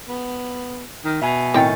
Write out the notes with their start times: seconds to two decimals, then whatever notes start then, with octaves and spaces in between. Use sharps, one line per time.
0.09 B3
1.05 D#3
1.22 B2 E5 G#5
1.54 A2 D#3 C4 C#5 G5 G#5 A6